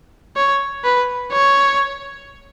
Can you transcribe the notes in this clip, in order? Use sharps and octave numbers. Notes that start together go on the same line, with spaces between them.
C#5
B4
C#5